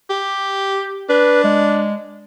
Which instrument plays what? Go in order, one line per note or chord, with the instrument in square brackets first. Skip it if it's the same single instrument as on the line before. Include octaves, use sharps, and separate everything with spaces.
[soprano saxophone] G4
[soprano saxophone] D4 [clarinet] B4
[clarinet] G#3